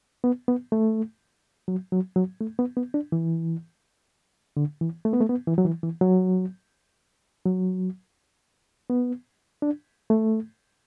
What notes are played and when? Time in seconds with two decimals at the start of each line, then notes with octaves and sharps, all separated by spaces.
0.24 B3
0.48 B3
0.72 A3
1.68 F#3
1.92 F#3
2.16 F#3
2.40 A3
2.59 B3
2.77 B3
2.94 D4
3.12 E3
4.57 D3
4.81 E3
5.05 A3
5.13 B3
5.20 A3
5.29 B3
5.48 E3
5.58 F#3
5.65 E3
5.83 E3
6.01 F#3
7.46 F#3
8.90 B3
9.62 D4
10.10 A3